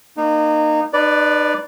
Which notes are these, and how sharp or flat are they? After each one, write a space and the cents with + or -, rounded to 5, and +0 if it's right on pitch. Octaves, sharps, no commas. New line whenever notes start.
A#3 -5 D#4 -25
D#4 -40 B4 +0 D5 +0